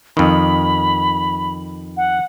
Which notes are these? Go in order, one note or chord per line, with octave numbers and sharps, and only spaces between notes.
F2 D#3 B5
F#5